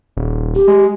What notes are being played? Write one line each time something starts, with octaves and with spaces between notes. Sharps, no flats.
D#1
G4
G#3